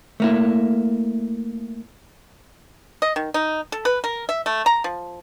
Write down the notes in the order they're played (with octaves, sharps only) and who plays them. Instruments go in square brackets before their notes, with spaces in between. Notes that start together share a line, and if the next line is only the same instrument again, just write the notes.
[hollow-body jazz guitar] A3 A#3 E4
[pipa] D#5
D#3
D#4
A4
B4
A#4
E5
A3
A#5
F3